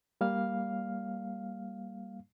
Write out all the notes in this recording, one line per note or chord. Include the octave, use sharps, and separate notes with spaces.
G3 A#3 F5 F6